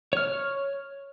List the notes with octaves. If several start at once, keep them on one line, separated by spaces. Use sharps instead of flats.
C#5 F6